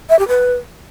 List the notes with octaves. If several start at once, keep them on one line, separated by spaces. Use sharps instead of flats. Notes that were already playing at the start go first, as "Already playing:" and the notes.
E5
G4
B4